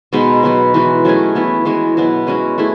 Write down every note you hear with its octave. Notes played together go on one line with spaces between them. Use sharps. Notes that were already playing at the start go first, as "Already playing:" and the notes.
B2 G#3 B3 D#4
F#3 B3 F#4 B4
E3 G#3 D#4 F#4
F#3 A3 C#4 G#4
E3 B3 E4
E3 G#3 B3 F#4
B2 F#3 B3 E4
G#3 C#4 F#4
A3 E4 G#4